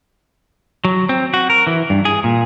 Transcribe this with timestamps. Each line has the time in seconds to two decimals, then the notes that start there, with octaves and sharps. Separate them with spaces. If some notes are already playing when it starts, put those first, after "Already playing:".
0.85 F#3
1.09 C4
1.34 F#4
1.50 A#4
1.67 E3
1.90 G2
2.05 G#4
2.24 A#2